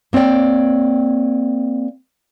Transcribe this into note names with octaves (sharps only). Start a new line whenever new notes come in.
A#3 C4 C#5 D5 G5